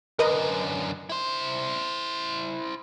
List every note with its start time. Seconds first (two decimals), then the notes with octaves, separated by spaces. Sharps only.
0.19 F#2 D3 A#4 B4 D#5
1.10 E4 C5